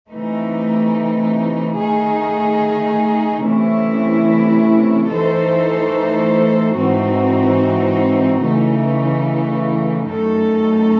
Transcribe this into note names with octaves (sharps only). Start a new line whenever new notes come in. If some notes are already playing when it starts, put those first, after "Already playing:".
C3 E3 A3 D#4
D#3 A3 D#4 G#4
C3 E3 A3 C#4 E4
E3 A3 D#4 A4 C5
G#2 E3 C4 D#4 F#4
C#3 E3 A3 D#4
F#2 D#3 A3 D#4 A4